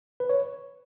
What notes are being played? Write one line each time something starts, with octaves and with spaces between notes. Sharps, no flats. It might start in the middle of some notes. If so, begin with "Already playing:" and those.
B4
C#5